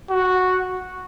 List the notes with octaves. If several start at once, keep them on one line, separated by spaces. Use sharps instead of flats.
F#4